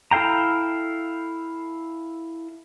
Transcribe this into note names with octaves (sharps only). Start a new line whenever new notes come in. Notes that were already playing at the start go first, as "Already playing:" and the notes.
E4 A4 F5 G5 A#5